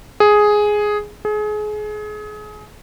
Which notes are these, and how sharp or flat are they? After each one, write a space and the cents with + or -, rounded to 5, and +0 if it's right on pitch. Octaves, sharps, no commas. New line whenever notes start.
G#4 +5
G#4 +30